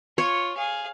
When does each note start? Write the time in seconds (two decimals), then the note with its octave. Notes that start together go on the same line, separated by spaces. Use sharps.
0.18 F4 C#5
0.56 G#4 F5